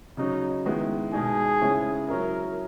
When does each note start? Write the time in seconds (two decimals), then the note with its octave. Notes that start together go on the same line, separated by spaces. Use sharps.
0.17 C#3 F#3 C#4 D#4
0.66 D#3 G#3 B3 E4
1.13 B2 G#3 D#4 G#4
1.61 C#3 G#3 C#4 E4
2.09 F#3 C#4 E4 A#4